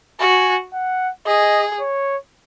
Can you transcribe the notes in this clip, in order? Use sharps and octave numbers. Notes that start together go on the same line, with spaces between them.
F#4 G#5
F#5
G#4 D#5
C#5